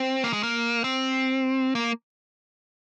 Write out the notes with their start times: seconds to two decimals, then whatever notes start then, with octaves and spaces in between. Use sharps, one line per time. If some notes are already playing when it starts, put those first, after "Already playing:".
Already playing: C4
0.24 A#3
0.33 G#3
0.43 A#3
0.84 C4
1.75 A#3